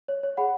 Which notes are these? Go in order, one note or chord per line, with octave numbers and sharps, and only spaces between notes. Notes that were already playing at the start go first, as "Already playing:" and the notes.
C#5
C#5
G#4 F#5 B5